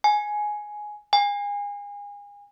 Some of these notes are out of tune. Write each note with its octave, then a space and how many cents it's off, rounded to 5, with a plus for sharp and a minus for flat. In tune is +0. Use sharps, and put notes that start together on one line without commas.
G#5 +10
G#5 -35